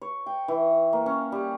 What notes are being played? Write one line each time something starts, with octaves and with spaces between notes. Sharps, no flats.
C#5
G5
E3
A#3
C#4
G3